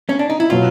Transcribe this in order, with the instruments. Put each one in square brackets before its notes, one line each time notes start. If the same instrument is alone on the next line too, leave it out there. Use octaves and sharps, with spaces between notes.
[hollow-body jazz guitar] C#4
D4
D#4
E4
[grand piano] B2 F#3 [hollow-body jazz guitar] F4